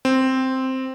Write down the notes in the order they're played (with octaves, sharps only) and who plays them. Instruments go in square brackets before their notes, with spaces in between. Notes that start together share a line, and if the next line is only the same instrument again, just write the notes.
[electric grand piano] C4